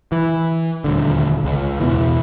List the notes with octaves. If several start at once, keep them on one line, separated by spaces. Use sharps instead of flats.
E3
D#1 D2 D3
C#2
E2 B2 E3